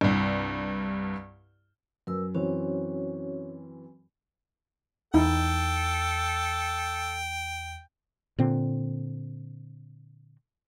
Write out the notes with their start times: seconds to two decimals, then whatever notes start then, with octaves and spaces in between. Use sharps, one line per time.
0.01 C2 G2
2.07 F#2 A#4 B4 E6
2.34 F#2 E3 C4 C#4 F#4 C#5
5.14 E2 D#4 E4 A4 G5
8.38 A#2 D3 C4